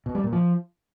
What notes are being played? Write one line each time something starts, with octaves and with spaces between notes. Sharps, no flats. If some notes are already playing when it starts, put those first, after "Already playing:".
B2
G3
A#2
F3